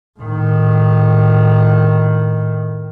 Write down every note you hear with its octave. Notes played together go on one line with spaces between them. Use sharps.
A2 D#3